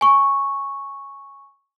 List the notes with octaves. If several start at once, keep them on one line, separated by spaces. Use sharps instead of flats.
G#5 C#6